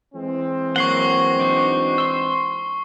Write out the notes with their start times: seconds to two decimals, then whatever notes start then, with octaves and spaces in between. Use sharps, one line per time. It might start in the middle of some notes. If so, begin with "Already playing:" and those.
0.14 E3 G#3 C4
0.76 F#3 A#3 F#5 C#6 C7 G7
1.39 D4 D#4 F#4
1.98 C6 E6